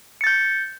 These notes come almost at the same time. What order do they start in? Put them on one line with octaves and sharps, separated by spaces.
C#7 A6 G6